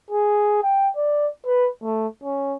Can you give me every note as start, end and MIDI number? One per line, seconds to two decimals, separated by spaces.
0.11 0.59 68
0.63 0.88 79
0.96 1.28 74
1.46 1.68 71
1.82 2.07 57
2.23 2.57 61